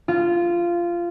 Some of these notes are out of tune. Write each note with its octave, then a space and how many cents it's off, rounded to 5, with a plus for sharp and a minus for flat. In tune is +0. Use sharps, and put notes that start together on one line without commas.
F4 -15